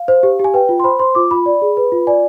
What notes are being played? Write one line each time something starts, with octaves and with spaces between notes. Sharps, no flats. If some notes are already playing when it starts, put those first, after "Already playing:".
Already playing: F5
C5
G4
G4 G#5
B4 G5
F4
C6
C5 B5
C5 C6
F4 D6
F4 B5
D5
G#4
B4
F4
D5 G#5